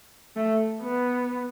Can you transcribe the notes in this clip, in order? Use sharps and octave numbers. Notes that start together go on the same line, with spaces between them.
A3
B3